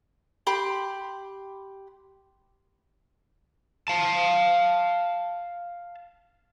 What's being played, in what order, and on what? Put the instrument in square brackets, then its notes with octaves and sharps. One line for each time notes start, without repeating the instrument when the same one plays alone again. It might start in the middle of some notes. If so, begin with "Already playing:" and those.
[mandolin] G4 B5 C6
[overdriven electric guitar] F5 A5